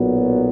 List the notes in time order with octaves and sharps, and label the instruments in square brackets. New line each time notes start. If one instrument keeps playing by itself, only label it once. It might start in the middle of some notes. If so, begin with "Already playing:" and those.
Already playing: [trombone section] B1 A#2 F#3 B3